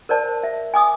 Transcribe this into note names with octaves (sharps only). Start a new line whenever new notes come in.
A#4 C5 D5 A5
E5
G#5 D6 D#6